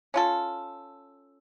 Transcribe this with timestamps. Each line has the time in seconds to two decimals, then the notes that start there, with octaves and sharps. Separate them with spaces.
0.14 C#4 F4 A4